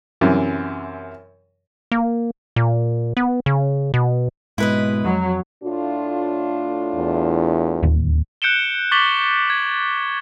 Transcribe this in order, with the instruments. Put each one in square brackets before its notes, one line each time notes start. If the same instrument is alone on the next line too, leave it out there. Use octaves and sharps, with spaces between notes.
[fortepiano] F#2 C3 E3
[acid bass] A#3
A#2
B3
C#3
B2
[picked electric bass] G#2 B2 [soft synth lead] G#3 [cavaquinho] E4 B4 D#5
[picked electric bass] F2 [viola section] F#3
[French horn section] A2 D4 F4
[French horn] E2
[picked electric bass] D1 D#2
[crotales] F#6 G6 C#7 D7 E7 G7
C#6 D6 A6 B6 F#7 G7
G#6